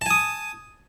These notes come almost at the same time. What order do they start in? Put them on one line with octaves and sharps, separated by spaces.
A5 G#5 D#6